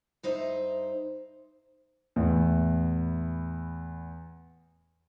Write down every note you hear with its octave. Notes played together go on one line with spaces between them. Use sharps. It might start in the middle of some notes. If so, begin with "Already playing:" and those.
G2 D#4 C5 E5
E2 A2